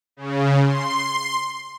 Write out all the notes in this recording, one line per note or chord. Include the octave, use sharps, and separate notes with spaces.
C#3
C6